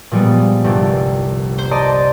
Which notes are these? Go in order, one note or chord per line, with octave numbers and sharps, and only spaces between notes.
A#2 F3 G3 G#3 B3
G1 C2 G4 A4
A#3 C5
C5 D5 D#5 A5 A#5 C6